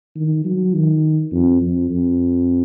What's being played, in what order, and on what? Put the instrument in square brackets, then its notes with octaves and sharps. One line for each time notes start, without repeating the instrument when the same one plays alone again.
[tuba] D#3
F#3
D#3
F2
F2
F2